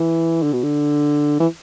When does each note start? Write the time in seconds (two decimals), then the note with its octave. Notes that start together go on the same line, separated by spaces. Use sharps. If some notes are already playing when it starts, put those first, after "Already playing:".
Already playing: E3
0.43 D3
0.53 B2
0.63 D3
1.40 E3